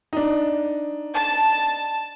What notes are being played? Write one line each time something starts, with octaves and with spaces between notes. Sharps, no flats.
D4 D#4
A5